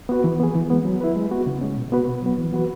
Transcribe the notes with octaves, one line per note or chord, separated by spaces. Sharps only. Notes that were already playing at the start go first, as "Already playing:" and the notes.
B3 F#4 B4
E3
B3 G#4
E3
G#3 B3
F#3
E4 B4
G#3
B3 F#4
C#3
G#3 C#4
B2
B3 F#4 B4
B2
F#3 B3
E3
B3 F#4 B4